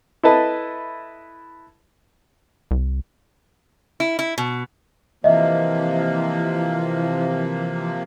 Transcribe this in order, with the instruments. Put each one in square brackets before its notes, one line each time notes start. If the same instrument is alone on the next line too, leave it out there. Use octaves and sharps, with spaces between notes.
[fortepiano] E4 A4 B4 D#5 A5
[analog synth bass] C2
[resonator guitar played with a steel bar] E4
E4
B2
[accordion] C3 F3 A#3 [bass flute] E3 [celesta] D#5 E5